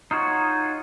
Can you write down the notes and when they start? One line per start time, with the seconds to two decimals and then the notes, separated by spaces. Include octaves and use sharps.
0.11 D#4 F4 F#4 C#5